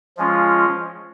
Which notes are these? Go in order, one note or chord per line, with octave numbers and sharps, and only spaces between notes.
F3 G#3 C#4 F4